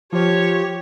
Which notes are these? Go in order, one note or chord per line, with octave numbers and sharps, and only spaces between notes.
F3 G4 C#5